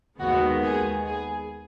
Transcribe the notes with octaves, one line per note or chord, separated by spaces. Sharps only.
D#2 D#3 G#3 B3 F#4
G#4
G#4